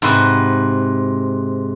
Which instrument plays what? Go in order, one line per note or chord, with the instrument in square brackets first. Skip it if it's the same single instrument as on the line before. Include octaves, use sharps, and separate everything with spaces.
[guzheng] G#2 C3 F#4 B4